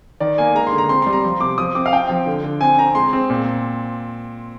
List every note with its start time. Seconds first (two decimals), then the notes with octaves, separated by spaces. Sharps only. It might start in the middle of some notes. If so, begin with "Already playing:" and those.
0.20 D#3 D5
0.38 A#3 G#5
0.55 G#3 A#5
0.67 C6
0.72 D3
0.78 A#5
0.89 C4 C6
1.02 G3 C6
1.13 A#5
1.24 F3 C6
1.40 C3 D6
1.58 F3 D#6
1.75 C4 D6
1.86 F5
1.93 C4 G5
2.09 F3
2.26 D3
2.44 D3
2.61 C4 G#5
2.79 C4 A#5
2.95 G#3 C6
3.13 C4
3.30 A#2